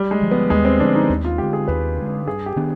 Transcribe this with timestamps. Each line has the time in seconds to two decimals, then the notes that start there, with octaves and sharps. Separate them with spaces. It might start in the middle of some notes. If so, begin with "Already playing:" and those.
Already playing: G3
0.11 G#3
0.21 D3 F3
0.31 B3
0.50 D#2 G#3
0.65 C4
0.80 D3 F3 D4
0.95 D#4
1.09 D#2
1.25 F4
1.38 D3 G#3 G4
1.53 G#4
1.68 D#2 B4
1.97 D3 G#3
2.27 G2 G#4
2.46 G4
2.56 D#3 B3 D4